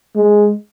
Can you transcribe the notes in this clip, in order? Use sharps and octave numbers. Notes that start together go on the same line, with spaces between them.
G#3